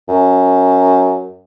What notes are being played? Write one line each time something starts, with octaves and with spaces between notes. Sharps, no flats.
F#2